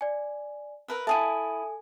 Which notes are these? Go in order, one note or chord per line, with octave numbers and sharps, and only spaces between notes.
D5 G#5
A#4 B4 E5
E4 G#4 A4 E5 G#5 A5 D#6 D#7